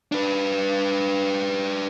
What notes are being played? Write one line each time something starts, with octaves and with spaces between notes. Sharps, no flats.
D4 B4